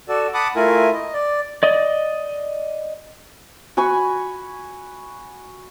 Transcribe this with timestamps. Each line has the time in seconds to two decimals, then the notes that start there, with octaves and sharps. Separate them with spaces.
0.09 F#4 A4 D5
0.34 F#5 A5 B5 D6 D#6
0.56 A3 E4 F4 A#4 G#5
0.93 D#5
1.14 D5
1.63 D5 D#5
3.77 F#4 G#5 B5 C#6